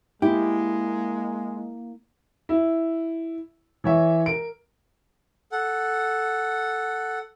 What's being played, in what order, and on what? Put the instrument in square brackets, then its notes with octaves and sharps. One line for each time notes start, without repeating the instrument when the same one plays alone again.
[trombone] G#3 [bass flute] A#3 [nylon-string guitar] E4 [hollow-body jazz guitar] G4
[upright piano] E4
E3 C#5 E5
A#4 D7
[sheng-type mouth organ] A4 F#5